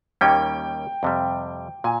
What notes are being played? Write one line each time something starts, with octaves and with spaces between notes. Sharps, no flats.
D#2 D#3 G3 A#3 C#4 G5
F2 C3 G3
A#2 G#5